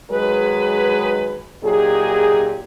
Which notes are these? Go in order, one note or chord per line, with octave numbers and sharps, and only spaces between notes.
D#3 F#3 G#3 G#4 B4
A#2 F#3 D#4 G4 G#4